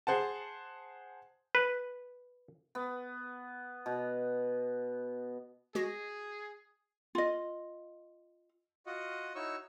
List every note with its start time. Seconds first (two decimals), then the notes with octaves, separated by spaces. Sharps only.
0.07 G#4 C5 F#5 A5
1.55 B4
2.75 B3
3.86 B2
5.75 G#3 F#4 G#4 A#6
7.15 F4 D#5
8.86 F4 F#4 D#5 F#5
9.35 D#4 E4 F#4 C#5 C#6 E6